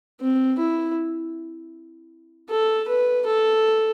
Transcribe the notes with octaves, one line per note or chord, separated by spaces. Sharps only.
C4
E4
A4
B4
A4